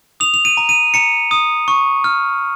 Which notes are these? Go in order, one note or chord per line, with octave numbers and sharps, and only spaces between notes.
D#6 F7
F7
D#7
A#5
D#7
A#5 C#7
D#6
C#6
F6